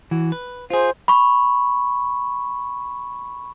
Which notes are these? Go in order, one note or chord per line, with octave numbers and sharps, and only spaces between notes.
E3 F#4
B4
F4 G#4 C5
B5 C#6